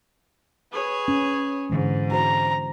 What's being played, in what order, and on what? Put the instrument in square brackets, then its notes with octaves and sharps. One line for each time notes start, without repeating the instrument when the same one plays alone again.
[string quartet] G#4 B4 C#5
[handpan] C#4
[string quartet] G#2 [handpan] D3 E3 G#3
[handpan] F#4 C5 [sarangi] A#5